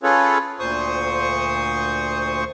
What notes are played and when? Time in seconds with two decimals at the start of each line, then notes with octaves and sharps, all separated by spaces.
0.03 C#4 F4 G#4 A4 B4 C#5
0.60 D2 A#2 C5 C#6 D#6